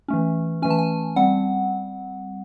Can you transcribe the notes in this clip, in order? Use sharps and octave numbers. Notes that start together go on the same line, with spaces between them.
E3 A3 C#4
E3 A3 C#4 G#5
A5
G#5
G3 C4 F#5